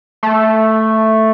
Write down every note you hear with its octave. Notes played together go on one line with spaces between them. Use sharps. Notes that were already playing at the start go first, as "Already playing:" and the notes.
A3